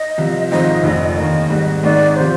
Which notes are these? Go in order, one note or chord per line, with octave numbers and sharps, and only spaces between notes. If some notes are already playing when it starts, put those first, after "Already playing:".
Already playing: D#5
C2 C3 F3
G#1 G#2 F3 C4 D#4 D#5
F1 F2 D3
D5
D#2 D#3 A#3 D#5
G#1 G#2 G3
G#1 G#2 D#3 G#3 D4 D5
C3 F3 C5